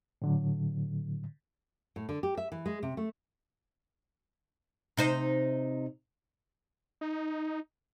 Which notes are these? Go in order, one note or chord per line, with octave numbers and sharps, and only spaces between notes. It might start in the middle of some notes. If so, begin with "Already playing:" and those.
A2 D3 F#3
A2
D3
G4
E5
E3
G#3
C3
A3
C3 D#4 C5
D#4